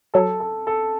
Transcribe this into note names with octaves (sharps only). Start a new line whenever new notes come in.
F#3 A4
A4
A4